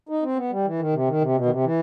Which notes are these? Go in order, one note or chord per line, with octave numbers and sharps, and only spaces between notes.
D#4
C4
B3
G3
E3
D#3
C3
D#3
C3
B2
D#3
C3
E3